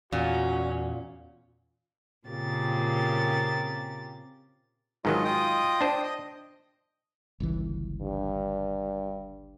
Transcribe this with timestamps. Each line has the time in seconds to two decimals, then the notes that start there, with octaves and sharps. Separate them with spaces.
0.12 E2 A#2 C#4 F#4
2.28 A#2 C#3 C4 G4 A#4 A6
5.05 G#2 D#3 F#3 F4 D#5
5.24 F4 D#5 G5 D#6
5.81 D4 C5
6.03 D#5
7.40 G1 C#2 E3
8.01 G2